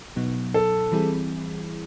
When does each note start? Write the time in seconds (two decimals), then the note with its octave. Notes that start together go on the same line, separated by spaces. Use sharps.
0.16 B2 F#3 B3 D#4
0.54 A4
0.92 E3 G3 C4 E4 G#4